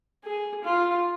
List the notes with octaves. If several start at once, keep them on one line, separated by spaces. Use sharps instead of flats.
G#4
F4